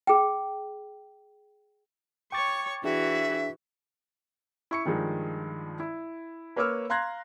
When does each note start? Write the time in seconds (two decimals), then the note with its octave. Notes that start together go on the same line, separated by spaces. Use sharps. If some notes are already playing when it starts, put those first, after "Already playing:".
0.07 G#4 G5
2.32 C#5 G5 C#6 D6 A6
2.84 E3 D4 F#4 G#4 E5 G5
4.71 E4 C#6 C#7
4.85 G2 D#3 F3 G#3
5.80 E4
6.56 A#3 B4 C#5 D6 E6 F6
6.90 F5 A#5 C6 F#6 G#6 A#6